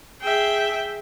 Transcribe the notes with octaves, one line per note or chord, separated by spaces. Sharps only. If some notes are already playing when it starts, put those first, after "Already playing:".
G#4 E5 G5